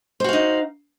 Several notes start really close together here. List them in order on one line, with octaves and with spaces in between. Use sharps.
C5 F#4 F5 D#4